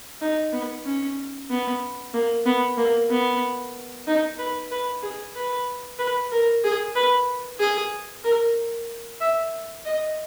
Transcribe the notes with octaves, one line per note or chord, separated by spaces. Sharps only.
D#4
B3
C#4
B3
A#3
B3
A#3
B3
D#4
B4
B4
G#4
B4
B4
A#4
G#4
B4
G#4
A#4
E5
D#5